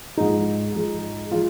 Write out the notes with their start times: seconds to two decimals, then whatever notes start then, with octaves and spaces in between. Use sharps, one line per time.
0.17 G#2 F3 G#3 D#4
0.74 G#2 F3 G#3
1.31 F3 G#3 F4